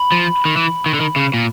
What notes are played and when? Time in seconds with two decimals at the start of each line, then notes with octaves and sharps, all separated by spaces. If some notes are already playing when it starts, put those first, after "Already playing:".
Already playing: B5
0.12 F3
0.45 D#3
0.57 E3
0.86 D#3
0.94 D3
1.01 D#3
1.16 C#3
1.34 A#2